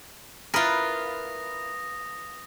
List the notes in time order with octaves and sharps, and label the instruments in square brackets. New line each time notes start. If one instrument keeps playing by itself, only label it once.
[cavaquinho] E4 A#4 [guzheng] F4 B4 [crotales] D#6 A#6